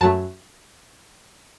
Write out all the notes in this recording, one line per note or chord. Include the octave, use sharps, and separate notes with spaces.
F#2 F#3 A3 A5